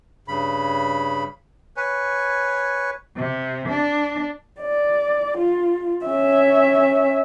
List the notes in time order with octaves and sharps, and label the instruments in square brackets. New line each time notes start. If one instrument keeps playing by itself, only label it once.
[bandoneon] G2 C#3 B5
B4 C#5 G#5
[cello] C3
D4
[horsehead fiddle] D5
F4
C#4 E5